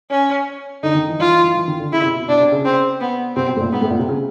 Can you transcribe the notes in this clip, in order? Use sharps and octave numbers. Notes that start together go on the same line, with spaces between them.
C#4
D3 D#4
D#3
E3
E3 F4
E3
E3
E3
D#3
D3
C#3 E4
C3
B2
B2 D4
C3
C#3
C4
B3
C3 C4
B2
A2
A#2
G#2 B3
A2
A#2
C3
C#3